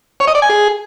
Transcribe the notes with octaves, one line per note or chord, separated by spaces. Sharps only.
C#5
D#5
D5
G#5
G#4